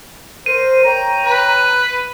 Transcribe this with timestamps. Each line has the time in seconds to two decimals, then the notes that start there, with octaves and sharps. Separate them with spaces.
0.46 A#4 C5 D#7
0.85 C#5 G5 A#5
1.25 B4